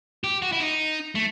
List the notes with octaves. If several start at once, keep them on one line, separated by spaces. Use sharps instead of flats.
G4
F#4
E4
D#4
A3